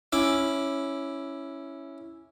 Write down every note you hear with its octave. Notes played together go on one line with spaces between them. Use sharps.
C#4 E4 D6